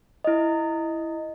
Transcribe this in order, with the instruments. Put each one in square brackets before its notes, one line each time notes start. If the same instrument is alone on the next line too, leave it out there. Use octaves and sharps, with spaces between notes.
[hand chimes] E4 D#5